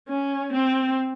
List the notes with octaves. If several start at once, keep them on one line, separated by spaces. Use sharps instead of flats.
C#4
C4